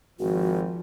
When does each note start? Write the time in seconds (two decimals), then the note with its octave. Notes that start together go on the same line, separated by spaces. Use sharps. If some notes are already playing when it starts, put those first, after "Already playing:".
0.19 G#1 F3 F#4